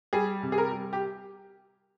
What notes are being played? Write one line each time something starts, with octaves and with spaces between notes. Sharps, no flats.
G3 G#4
C3
G#4
A#4
G3
G4